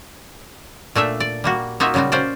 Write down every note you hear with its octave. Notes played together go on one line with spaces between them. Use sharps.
A#2 A3 D4 E5
D5
G3 A#3 F#4
A#3 D#4 F4 F#4 E5
C#3 F#3 G3 F4 F#4
C#4 F4 C5 D5